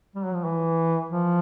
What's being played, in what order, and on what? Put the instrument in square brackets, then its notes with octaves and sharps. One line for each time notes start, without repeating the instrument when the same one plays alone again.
[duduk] G3
F#3
F3
E3
F3